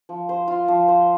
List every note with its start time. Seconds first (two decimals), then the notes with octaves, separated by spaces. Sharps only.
0.09 F3
0.29 C5
0.48 F4
0.68 F3
0.88 C5